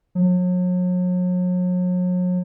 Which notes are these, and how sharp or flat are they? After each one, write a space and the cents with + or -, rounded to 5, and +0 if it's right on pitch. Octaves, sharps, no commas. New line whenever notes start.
F#3 -40